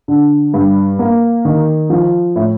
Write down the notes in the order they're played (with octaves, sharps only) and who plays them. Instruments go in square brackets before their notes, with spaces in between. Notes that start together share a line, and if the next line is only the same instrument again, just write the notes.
[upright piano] D3
G2
A#3
D#3
F3
A2